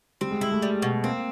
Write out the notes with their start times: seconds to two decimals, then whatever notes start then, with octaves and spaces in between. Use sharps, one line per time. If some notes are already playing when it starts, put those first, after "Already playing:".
0.21 G3 C4
0.31 G#3
0.41 G#3 E4
0.52 A3
0.62 G3
0.82 B2
1.04 A#3 C4